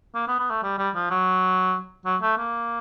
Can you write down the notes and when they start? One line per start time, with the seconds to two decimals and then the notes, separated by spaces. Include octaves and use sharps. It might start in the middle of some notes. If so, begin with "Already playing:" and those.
0.15 A#3
0.28 B3
0.39 B3
0.51 A3
0.63 G3
0.78 G3
0.95 F3
1.10 F#3
2.05 F#3
2.22 A3
2.37 A#3